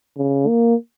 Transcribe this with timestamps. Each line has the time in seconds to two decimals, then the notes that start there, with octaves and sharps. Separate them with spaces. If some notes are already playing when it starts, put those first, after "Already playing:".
0.17 C#3
0.47 A#3